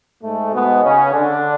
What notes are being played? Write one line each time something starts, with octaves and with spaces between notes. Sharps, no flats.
G#2 G#3 A3
B2 B3
C#3 C#4
D3 D4